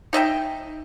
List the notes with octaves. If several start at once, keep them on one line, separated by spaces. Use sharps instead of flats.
D#4 D#5 E5 G5